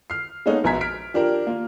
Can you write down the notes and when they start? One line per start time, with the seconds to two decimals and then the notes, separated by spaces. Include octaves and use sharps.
0.10 F6 C7
0.46 G#3 A#3 B3 C#4 D#4 A4
0.64 A#1 B2 G#5 A#5 G#6 B6
0.81 F6 B6 D7
1.14 F3 D4 G4 A#4
1.47 A#3 F4